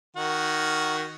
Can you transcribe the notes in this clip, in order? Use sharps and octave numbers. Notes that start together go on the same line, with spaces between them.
D#3 F#4